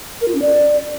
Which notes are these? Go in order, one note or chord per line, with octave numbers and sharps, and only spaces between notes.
A#4
F4
C#4
D5